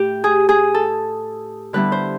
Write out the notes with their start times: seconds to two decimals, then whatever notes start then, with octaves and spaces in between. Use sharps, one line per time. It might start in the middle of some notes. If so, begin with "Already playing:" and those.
Already playing: A2 G4
0.24 G#4
0.49 G#4
0.74 A4
1.73 D3 G3 B3 E4 B4
1.92 C5